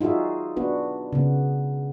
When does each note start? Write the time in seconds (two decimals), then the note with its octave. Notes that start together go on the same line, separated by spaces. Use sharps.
0.01 D#4 F4 F#4 G#4 E5
0.56 B3 D4 F#4 B4
1.13 C#3 B3